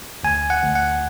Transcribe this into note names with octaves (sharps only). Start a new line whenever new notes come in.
D2 G#5
F#5
D2
F#5